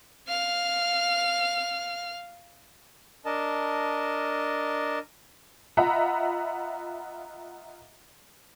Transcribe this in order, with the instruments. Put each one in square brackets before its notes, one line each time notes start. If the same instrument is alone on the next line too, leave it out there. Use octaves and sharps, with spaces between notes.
[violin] F5 F6
[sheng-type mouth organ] D4 A#4 D#5 A5
[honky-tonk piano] F4 D#5 E5 F#5 A#5 B5